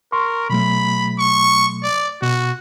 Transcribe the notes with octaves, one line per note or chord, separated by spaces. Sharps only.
A#4 C6 C#6
B2 F#3 A3 B5
C#6
D5
B2 F#4